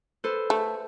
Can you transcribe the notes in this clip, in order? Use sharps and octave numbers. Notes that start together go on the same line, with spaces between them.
A4 B4 C5
A3